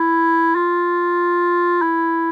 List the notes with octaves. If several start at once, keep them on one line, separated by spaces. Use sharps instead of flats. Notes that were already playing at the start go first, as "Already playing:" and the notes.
Already playing: E4
F4
E4